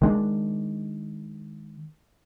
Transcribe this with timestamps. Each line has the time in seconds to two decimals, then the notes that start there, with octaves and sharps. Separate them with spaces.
0.02 D#3 G#3 D4